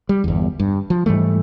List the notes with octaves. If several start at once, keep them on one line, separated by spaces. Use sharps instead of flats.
G3
G1 E2
G2
F3
G#2 E3 G3 A3